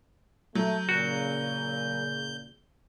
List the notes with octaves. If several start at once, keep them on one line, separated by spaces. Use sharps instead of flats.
F#3 A3 G6
A#2 C#3 F#4